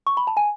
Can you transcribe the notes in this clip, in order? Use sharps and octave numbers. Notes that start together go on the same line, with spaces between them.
C#6
B5
A5
G#5